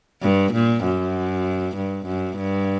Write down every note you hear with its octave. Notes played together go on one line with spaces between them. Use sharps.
G2
A#2
F#2
G2
F#2
G2